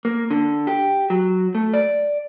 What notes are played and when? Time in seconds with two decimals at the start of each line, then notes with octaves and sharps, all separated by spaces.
0.05 A#3
0.31 D3
0.67 G4
1.10 F#3
1.55 A3
1.74 D5